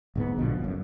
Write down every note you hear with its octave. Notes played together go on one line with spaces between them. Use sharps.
D1 G#2 B3
A#1 B2 D3 F3
F#1 F#2